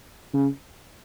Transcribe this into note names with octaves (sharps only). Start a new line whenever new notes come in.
C#3